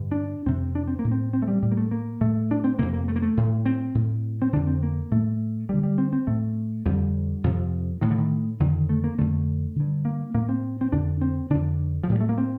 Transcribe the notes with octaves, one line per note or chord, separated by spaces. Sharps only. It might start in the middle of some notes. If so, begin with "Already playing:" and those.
Already playing: G2 D3
D4
F2 C3 C4
D4
C4
A#3
A2
C4
C4
A3
G3
A2 G3
A#3
A3
A#3
A2 A3
D4
C4
F2 C3 A#3
A#3
A3
A#3
A3
A2
C4
A2
C4
F2 D3 D4
C4
A#3
A2 A3
G2 D3 G3
G3
C4
C4
A2 A3
F2 D3 G3
F2 C3 F3
A2 D#3
D3
D#3
F2 D3 D#3
A3
A#3
F2 D3 A3
G2 D3
A#3
A2 A#3
C4
C4
F2 D3 D4
C4
F2 D3 D4
F3
A2 G3
A3
A#3
C4